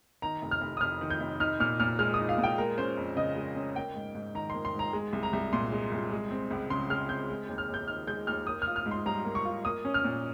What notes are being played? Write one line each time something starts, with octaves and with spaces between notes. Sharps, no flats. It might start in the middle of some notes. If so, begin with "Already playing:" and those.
D#3 A#5
F1
F6
F1
D#6
F2 F6
D#3
G6
F1
D#4 F6
A#2 F6
A#2 F6
G#3 F6
D#6
D#4
F5
A#2
G5
G#3 A#4
C#4 C5
F2
C#3 D#5
G#3
C#4
A#3 G5
G#2
G#2
D#3 A#5
A#3 C6
C6
G#2 A#5
G#3
C2
A#5
C2
A#2 C6
G#3
C2
G#3
C4
C#2
C#3 C6
G#3 F6
C4 G6
G#3
D#2
F6
D#2
G6
D#3 F6
G#3 G6
D#2 F6
A#3 D#6
F4 F6
F6
G#2
C6
G3 A#5
A#3
C#6
F4
A#3 D#6
C#4
F6
A#2